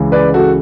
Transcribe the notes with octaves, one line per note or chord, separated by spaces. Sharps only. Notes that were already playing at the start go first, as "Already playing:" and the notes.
Already playing: C#2 C#3 E3 G#3
B4 D5
F#4 A4